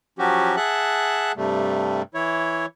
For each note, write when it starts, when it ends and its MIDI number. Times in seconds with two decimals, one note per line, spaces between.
0.19 0.56 53
0.19 0.56 54
0.19 0.56 61
0.19 0.56 66
0.19 0.56 67
0.57 1.32 68
0.57 1.32 76
0.57 1.32 78
0.57 1.32 81
0.57 1.32 90
1.36 2.02 43
1.36 2.02 48
1.36 2.02 55
1.36 2.02 57
2.14 2.66 52
2.14 2.66 64
2.14 2.66 73